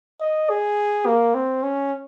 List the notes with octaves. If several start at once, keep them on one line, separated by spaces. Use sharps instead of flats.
D#5
G#4
A#3
C4
C#4